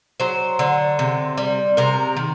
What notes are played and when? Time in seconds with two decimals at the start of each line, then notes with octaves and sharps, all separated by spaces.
0.20 F#3 C5
0.59 D3
0.99 C3
1.38 G3
1.77 C3 A#4
2.16 D#3